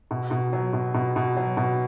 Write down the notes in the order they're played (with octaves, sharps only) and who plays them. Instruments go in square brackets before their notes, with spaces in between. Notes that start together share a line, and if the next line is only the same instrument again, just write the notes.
[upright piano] B2
B2
F#3
B2
B2
B2
F#3
B2